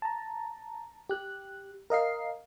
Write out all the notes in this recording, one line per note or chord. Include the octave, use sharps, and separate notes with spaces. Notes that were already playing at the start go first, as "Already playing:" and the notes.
A5 A#5
G4 F#6
A#4 D#5 F5 C7